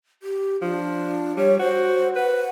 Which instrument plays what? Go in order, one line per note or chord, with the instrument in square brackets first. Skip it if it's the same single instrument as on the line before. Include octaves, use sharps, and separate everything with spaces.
[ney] G4
[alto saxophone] F3 [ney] D4
[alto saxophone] G3 [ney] C#5
[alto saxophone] F#4 [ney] C5
[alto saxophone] B4 [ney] F#5